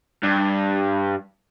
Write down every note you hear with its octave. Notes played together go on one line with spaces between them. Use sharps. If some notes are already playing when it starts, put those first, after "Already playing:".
G2